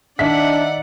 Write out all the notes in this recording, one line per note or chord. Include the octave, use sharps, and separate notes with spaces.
D#3 D4 D#4 D5 E5 F#5 B6